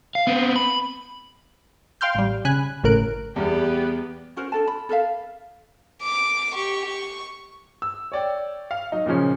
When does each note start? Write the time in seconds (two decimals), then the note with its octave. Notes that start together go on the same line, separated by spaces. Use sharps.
0.15 F5
0.27 B3 C4
0.56 B5
2.01 F5 G5 C6 F6 G6
2.15 A1 G3
2.45 C#3 G#5 B5 F#6
2.84 G#1 A2 C#3 A#4 F#6 D7
3.36 E2 G3 B3 G4
4.36 C#4 F#4 A#4 C5
4.52 D4 A4 A5
4.68 B5
4.89 A4 A#4 E5 F5
6.03 D6
6.54 G4 C#6
6.88 C#6
7.82 E6
8.12 C#5 D5 G5
8.71 F5
8.92 F#3 D#4
9.06 A#2 C#3 F3 C#4